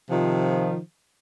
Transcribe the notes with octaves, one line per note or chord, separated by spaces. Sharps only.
C3 D#3 F3